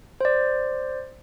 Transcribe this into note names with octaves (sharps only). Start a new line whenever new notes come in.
C5 D5